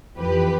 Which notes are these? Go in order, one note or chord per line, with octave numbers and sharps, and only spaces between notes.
F2 E3 G4 B4